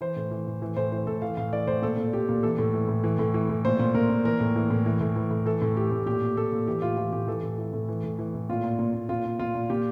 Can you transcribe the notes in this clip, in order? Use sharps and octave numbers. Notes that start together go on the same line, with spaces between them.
E3 C5
A2
E3
A2
E3
A2 C5
E3 C5
A2 A4
E3 F5
A2 F5
E3 D5
A2 C5
A#2 A4
A#2
A#2 G4
A#2
E3 A4
A2
E3
A2
E3
A2
E3
A2
A#2 C5
A#2
A#2 A#4
A#2
E3 A#4
A2
E3
A2
E3
A2
E3
A2
E3 A4
A2
E3 G4
A2
A#2 G4
A#2
A#2 A4
A#2
E3 G4
A2 F4
E3 F4
A2 G4
E3 A4
A2
E3
A2
E3
A2
E3
A2
A#2 F4
A#2
A#2
A#2
A#2 F4
A#2
A#2 F4
A#2
A#2 G4